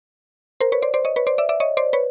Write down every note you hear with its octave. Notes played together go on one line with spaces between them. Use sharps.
A#4 C5
B4 C#5
C5 D5
C5 D5
C#5 D#5
B4 C#5
C5 D5
D5 E5
D5 E5
C#5 D#5
C5 D5
B4 C#5